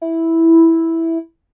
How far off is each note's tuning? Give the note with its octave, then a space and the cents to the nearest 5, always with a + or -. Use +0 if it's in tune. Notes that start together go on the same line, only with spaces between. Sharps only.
E4 -5